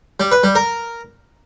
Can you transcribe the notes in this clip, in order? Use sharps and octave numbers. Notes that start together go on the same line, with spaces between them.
G3
B4
G3
A#4